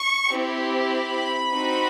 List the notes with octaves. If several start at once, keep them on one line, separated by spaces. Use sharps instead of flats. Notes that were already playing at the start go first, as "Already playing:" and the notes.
Already playing: C#6
C4 E4 G4
B5
C4 D#4 F#4